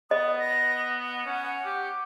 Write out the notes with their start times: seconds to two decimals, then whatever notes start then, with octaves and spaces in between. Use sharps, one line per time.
0.11 B3 D#5 D#6
0.39 A#6
1.03 F#5
1.26 C#4
1.65 G4